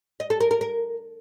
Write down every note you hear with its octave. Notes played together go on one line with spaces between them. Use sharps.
D#5
A4
A#4
A#4
A#4